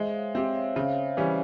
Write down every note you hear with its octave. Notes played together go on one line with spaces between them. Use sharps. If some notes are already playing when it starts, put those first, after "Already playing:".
Already playing: G#3 C5 E5
C#5 F5
C4 G4 C5 E5
C#5 F5
C#3 C#5 F5
E3 G3 C#4